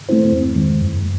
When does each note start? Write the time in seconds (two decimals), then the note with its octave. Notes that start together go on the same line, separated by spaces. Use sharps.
0.09 A3 C4 E4 C5
0.32 E2
0.56 D#3 G#3
0.81 F#2